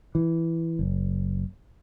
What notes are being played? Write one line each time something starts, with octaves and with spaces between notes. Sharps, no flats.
E3
F#1